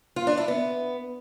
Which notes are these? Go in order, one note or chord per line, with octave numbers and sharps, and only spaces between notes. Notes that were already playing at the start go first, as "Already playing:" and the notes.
F4
D4
E4
B3